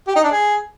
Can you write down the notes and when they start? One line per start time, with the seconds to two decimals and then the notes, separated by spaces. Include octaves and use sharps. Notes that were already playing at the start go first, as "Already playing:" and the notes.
0.08 G4
0.16 D#4
0.24 D4
0.32 G#4